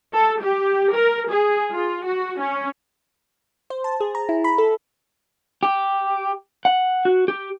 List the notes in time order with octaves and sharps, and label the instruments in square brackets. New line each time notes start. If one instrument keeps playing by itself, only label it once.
[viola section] A4
G4
A#4
G#4
F4
F#4
C#4
[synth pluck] C5
A5
G#4
A#5
E4
B5
A4
[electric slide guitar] G4
F#5
F#4
G4